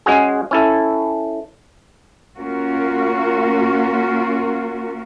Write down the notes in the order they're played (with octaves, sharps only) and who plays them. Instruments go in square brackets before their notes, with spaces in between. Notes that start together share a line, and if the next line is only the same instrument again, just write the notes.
[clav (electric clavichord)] G#3 C#4 F#4 G#4
C#4 E4 A4
[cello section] A#3 C#4 F4 F#4 A#4